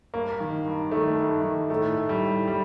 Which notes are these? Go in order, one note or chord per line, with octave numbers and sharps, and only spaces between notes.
G2 A#3
D#3
G2
D#3 A3
G2
D#3
A2 A3
A2
G3
A2
A2 G3